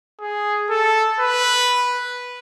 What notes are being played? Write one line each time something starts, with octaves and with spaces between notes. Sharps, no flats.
G#4
A4
B4